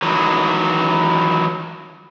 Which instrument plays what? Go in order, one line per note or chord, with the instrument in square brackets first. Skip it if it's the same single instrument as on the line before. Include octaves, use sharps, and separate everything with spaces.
[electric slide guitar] D#3 E3 F#3